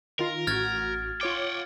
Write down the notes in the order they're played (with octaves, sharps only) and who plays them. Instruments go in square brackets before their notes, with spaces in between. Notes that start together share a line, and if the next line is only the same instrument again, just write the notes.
[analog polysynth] D#3 F4 [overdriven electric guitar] A#4
[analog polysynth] A1 F#4 [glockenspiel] F6 G#6 A6
[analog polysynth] F4 C#5 D6 [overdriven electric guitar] F#5 G5